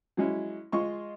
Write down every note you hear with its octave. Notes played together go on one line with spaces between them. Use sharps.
F#3 G#3 C#4 E4
G#3 F4 D#5 C#6